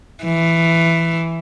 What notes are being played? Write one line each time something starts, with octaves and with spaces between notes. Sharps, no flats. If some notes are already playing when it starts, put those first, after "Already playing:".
E3